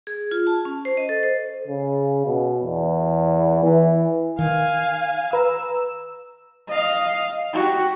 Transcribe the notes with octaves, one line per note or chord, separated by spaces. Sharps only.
G#4
F4
A5
C#4
C5
D#5
A4
C5
C#3
B2
E2
E3
D#3 F5 G#5
B4 A#5 E6
D#5 F5
F#4 G4